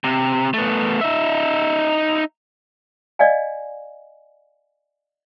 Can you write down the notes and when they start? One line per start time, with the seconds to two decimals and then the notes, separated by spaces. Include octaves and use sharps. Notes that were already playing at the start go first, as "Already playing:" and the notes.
0.04 C3
0.54 A3 B3
1.01 D#4 E5
3.19 D5 D#5 F5 G#5